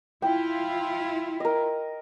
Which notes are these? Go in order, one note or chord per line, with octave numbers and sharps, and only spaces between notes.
E4 F4 G5
A#4 D#5